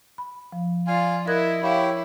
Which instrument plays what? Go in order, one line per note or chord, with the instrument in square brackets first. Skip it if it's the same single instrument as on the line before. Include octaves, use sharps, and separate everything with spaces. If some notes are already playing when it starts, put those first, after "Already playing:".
[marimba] B5
F3
[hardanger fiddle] F4 D5 [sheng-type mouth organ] F5 G#5
[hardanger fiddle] E4 [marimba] A#4 F#6 G#6 [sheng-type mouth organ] D#5
[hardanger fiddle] E4 [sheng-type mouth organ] G4 C#5 [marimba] F5 B5